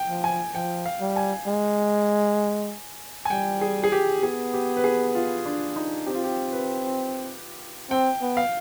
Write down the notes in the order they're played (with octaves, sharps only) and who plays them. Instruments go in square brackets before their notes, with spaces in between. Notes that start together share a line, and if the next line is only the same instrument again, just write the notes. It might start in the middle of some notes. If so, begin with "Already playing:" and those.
Already playing: [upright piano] G5
[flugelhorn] F3
[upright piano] G#5
[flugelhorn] F3 [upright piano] G5
[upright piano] F5
[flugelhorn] G3
[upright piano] G#5
[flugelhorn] G#3
[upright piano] G#5
[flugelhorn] G3 [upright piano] G5
[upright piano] G#4
G#4
G4
[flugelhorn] B3 [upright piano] G#4
[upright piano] G4
B4
G#4
F4
D4
D#4
[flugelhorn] C4 [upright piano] G4
[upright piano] F4
G4
B4
[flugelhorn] C4 [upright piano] G5
[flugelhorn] B3
[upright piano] F5